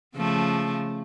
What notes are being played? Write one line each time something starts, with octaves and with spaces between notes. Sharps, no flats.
C#3 F3 A3